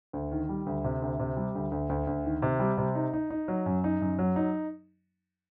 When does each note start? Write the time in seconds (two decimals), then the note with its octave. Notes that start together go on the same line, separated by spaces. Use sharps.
0.13 D2
0.32 D#3
0.49 G3
0.66 D2
0.84 C3
1.02 D2
1.19 C3
1.37 G3
1.55 D2
1.71 D2
1.89 D2
2.07 D2
2.25 D#3
2.42 C3
2.60 G3
2.78 C3
2.95 D#4
3.14 D#4
3.30 D#4
3.48 F#3
3.66 F#2
3.84 D#4
4.01 F#2
4.19 F#3
4.36 D#4